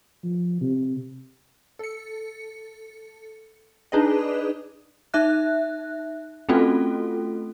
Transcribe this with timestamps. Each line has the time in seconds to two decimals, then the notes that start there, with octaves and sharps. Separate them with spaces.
0.24 F3
0.61 C3
1.79 A4 C#7
3.92 D4 D#4 G#4 B4 D5 D#5
5.14 D#4 E5 F#6
6.49 A3 C4 C#4 F4 F#4 A4